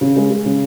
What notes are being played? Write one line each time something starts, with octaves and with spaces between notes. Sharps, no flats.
C#3
G#3
G#3
C#3